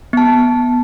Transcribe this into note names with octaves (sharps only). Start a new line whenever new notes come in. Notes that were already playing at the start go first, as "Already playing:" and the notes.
B3 A5